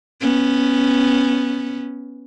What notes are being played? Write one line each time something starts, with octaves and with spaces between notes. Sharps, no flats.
B3 C#4